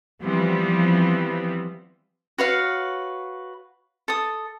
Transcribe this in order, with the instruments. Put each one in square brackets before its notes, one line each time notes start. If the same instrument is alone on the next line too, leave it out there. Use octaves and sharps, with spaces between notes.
[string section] E3 F3 G3 B3 C4
[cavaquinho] F#4 B4 C#5 F5
A4 D#6